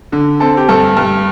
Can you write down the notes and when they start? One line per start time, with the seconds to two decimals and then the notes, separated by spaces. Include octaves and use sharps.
0.12 D3
0.40 C4 A4
0.57 G4
0.69 G2 A4
0.97 G2